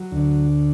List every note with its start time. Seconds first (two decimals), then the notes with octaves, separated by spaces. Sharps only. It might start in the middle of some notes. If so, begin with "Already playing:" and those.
Already playing: F#3
0.12 D2 D3